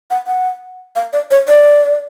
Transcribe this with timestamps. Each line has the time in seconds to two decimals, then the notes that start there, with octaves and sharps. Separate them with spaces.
0.11 F#5
0.27 F#5
0.96 F5
1.13 D5
1.31 C#5
1.48 D5